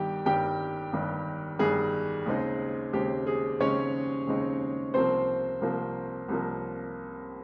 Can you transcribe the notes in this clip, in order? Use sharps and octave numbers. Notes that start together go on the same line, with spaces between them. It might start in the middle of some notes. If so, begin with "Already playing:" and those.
Already playing: G1 G2 D#3 G4 G5
G1 G2 D#3 G4 G5
G1 G2 D#3
G1 G2 D#3 G#4
D#2 C#3 G#3 C4 D#4
D#2 C#3 G#3 C4 D#4 G4
G#4
D#2 C#3 G#3 C4 C#4 D#4 C#5
D#2 C#3 G#3 C4 D#4
C2 C3 F3 A#3 C4 C5
C2 C3 F3 A#3
C2 C3 F3 A#3